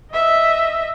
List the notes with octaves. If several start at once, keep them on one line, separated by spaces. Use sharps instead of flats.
D#5 E5